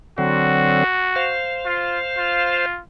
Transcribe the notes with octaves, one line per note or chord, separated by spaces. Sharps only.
D3 F#3 C4 F#4
C5 F5
F4
F4